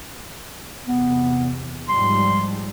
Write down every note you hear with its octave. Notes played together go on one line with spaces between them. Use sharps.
E2 C3 B3
G#2 F3 G3 C6